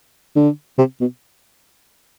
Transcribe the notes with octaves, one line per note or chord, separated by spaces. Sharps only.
D3
C3
B2